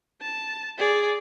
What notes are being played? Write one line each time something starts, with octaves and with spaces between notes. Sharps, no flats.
A5
G#4 D5